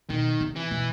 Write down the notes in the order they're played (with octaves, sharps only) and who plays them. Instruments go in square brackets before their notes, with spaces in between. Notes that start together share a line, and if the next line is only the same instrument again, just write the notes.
[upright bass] B2 [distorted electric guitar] D#3
[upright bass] C3
[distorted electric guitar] E3
[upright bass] B2